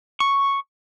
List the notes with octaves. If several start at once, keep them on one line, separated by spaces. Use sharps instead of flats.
C#6